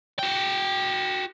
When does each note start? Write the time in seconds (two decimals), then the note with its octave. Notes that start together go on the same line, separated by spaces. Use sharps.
0.19 F#4 G5